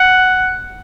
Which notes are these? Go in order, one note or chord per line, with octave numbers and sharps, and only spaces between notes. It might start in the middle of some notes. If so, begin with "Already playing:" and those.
Already playing: F#5